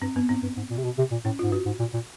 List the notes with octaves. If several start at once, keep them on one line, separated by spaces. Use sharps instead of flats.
G2 C4
G2 B3
G#2 C4
G2
G#2
A#2
C3
B2
C3
A#2
A2 C#4
G#2 F4
G2 F#4
G#2
A#2
A#2